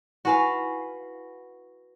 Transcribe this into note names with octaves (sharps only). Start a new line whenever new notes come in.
E4 F#4 B4 F5 G#5 C6